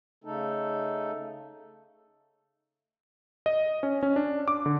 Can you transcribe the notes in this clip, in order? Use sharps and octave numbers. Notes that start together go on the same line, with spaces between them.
C#3 A3 D#4 A4
D#5
C#4
C#4
D4
D6
D3